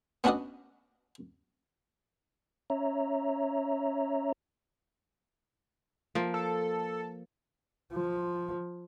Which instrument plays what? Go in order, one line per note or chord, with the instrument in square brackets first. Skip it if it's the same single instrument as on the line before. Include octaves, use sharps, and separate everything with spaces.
[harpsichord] B3 C#4 D4 F#4 D5 D#5
[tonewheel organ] C#4 C#5 E5 A#5
[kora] F3 A#3
[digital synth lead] A4
[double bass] F3